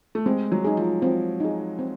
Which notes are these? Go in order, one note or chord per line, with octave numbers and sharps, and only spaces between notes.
A3
G#3 C4
F#3
D#4 G#4
F3
F3 C4
D#4 G#4
C4